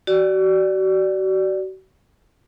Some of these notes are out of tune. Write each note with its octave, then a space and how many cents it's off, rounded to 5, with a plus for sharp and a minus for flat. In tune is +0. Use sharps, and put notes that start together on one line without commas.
F#4 +40 D5 +0